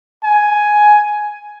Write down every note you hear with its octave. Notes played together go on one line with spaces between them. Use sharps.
G#5